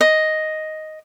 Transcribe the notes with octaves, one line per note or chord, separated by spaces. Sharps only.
D#5